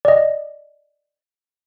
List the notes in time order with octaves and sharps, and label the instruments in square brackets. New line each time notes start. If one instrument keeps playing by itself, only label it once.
[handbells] D5 D#5